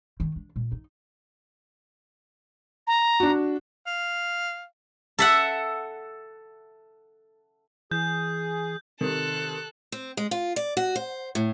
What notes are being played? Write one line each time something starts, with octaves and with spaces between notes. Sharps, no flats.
D#3
D4
A#2
D#4
A#5
D4 F#4
F5
A4 E5 F#5
E3 G#4 G6
C3 D#3 A4 F#6
C4
G#3
F4
D5
F#4
C5
A2